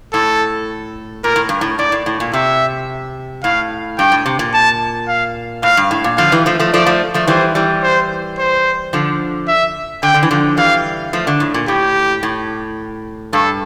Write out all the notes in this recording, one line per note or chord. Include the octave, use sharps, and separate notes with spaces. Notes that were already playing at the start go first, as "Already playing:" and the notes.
A2 A4
A#2 A#4
A2
G2
A2
A2 D5
A2
A2
A#2
C3 E5
A2 F5
G2 G5
A2
C3
A#2
A5
F5
A2 F5
G2
A2
A#2
D3 F3 F5
E3 G3
F3 A3
F3 A3
F3 A3 D5
F3 A3
F3 A3
E3 G3 C5
E3 G3
C5
C5
D3 F3
E5
D3 G5
D3
E3
D3 F3
E3 G3 F5
F3 A3
D3
A2
A#2
A2 G4
A2
G2 A4